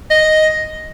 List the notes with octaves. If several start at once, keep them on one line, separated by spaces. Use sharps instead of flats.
D#5